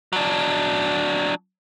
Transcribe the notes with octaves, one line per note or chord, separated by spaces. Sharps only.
F#3 D4